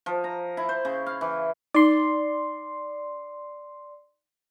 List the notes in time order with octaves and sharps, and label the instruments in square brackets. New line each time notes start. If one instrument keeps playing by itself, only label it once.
[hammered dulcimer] F3
A#5
E4
C5
C#3
F5
E3
[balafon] D#4 [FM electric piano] D5 C6